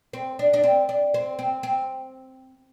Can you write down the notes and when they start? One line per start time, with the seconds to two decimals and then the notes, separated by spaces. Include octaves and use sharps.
0.13 C4
0.39 D4
0.53 D4
0.64 C4
0.89 D4
1.14 C4
1.39 C4
1.63 C4